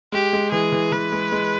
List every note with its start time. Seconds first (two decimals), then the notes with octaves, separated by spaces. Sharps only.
0.12 G#3 G4
0.33 G#3
0.52 E3 G#4
0.72 E3
0.92 E3 B4
1.12 G#3
1.32 G#3